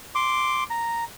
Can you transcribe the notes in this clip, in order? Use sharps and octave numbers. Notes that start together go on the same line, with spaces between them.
C6 D6
A#5